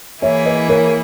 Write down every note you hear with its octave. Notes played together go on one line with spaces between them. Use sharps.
E3 A#3 E4 G#4 C#5 E5
B4 D#5
A#4 C#5